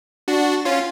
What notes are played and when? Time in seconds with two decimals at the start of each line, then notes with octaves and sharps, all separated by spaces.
0.28 D4 F#4
0.65 C#4 F4